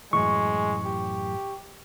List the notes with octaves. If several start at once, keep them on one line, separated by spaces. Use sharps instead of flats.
F#2 A2 E3 G#3 C#6
G4